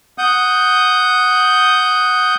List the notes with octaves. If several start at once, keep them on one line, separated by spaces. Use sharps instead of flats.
F#5 D#6 G6